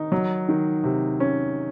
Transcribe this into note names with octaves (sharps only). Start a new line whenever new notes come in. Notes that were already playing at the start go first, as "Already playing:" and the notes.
Already playing: D#3 D#4
F#3
D#3
C3
C#4